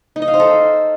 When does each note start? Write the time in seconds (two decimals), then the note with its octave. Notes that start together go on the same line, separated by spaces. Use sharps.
0.16 D#4
0.22 D#5
0.28 F5
0.34 C5
0.40 A4